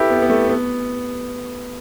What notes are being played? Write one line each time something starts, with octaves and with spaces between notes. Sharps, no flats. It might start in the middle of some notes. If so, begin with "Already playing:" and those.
Already playing: E4 G4 A4 B4
B3
B3
A3
B3